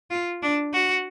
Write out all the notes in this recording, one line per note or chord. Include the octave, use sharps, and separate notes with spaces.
F4
D4
F#4